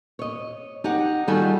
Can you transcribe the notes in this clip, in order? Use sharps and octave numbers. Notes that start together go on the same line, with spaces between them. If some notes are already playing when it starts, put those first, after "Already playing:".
C#5 D#5
D#4 G4 F#5
D#3 G3 F4 F#4 G#4 A4